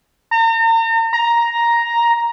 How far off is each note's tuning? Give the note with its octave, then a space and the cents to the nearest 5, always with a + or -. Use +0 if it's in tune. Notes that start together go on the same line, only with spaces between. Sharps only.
A#5 -40
A#5 +5